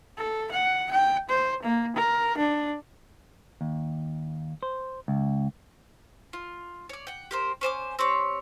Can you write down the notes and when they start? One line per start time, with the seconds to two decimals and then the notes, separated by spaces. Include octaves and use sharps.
0.17 A4
0.51 F#5
0.91 G5
1.29 C5
1.63 A#3
1.96 A#4
2.37 D4
3.61 D#2
4.63 C5
5.08 C#2
6.33 F4
6.89 C#5 D5
7.07 F#5 G5
7.31 G4 A#4 C5
7.61 C#4 C5 G#5 D6
7.99 C4 G4 C#5